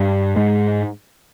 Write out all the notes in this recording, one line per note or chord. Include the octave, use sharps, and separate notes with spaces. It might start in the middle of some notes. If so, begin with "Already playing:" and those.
Already playing: G2 G3
G#2 G#3